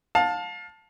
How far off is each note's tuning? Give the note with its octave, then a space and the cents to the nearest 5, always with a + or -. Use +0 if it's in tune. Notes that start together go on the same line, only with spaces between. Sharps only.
F5 +30 A5 +0